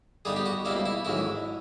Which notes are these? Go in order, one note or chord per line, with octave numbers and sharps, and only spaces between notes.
G2 D3 G3 B3 D#4 G#4
G4
F#4
C#2 B2 G3 A#3 E4
E4
A1 G#2 D#3 F#3 E4